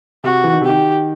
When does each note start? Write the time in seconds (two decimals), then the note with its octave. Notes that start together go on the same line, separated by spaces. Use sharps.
0.24 C3 F#4
0.44 E3
0.53 D#3
0.61 C3
0.65 D#3 G4